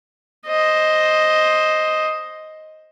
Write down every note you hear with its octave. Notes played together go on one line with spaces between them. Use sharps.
C5 D#5